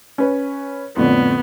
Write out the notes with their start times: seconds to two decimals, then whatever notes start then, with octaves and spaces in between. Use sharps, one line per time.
0.18 C#4 B4 C#5
0.97 F2 A2 D3 B3